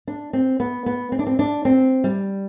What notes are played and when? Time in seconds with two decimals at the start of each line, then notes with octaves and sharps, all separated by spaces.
0.07 D4
0.33 C4
0.60 B3
0.86 B3
1.12 C4
1.19 D4
1.27 C4
1.39 D4
1.65 C4
2.04 G3